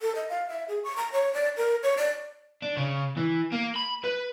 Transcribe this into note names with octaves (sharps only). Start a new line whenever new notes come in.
A4
D#5
F5
E5
G#4
C#6
A#5
C#5
D5
A#4
C#5
D5
D4
C#3
E3
A#3
B5
B4